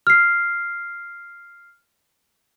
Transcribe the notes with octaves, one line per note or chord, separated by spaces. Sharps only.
F6 C7